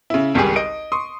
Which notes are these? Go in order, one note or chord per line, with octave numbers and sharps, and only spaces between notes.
C#3 E4
G#1 C#2 G3 G4 G#4
D#5 D7
C6 C#6 D#6